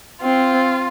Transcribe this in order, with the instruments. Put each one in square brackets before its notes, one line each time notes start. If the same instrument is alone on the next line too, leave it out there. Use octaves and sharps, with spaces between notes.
[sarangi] C4 [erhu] F4